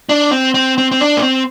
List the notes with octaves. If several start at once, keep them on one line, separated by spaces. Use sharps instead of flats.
D4
C4
C4
C4
C4
D4
A#3
C4